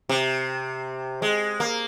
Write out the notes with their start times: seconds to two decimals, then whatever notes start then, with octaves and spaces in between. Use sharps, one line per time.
0.09 C3
1.22 G#3
1.60 A#3